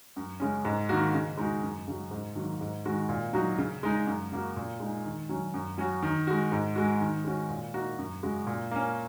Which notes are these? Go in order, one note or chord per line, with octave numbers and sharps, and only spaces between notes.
F#2
C#3 G#3 C#4
G#2
D#3 A#3 F#4
C#3
G#3 D#4 F#4
F#2
C#3 F#3
G#2
D#3 F#3 A#3
G#2
D#3 G#3 F#4
A#2
F#3 D#4 F#4
C#3
G#3 D#4
F#2
C#3 A#3 F#4
A#2
G#3 D#4
D#3
F#3 C#4
F#2
F#3 C#4 F#4
D#3
G#3 F#4
G#2
G#3 F#4
D#3
G#3 C#4 F#4
A#2
A#3 D#4 F#4
F#2
C#3 G#3 F#4
A#2
A#3 C#4